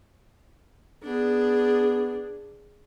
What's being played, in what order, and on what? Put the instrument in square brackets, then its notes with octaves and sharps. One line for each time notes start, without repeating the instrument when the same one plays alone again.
[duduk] B3 [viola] D4 G#4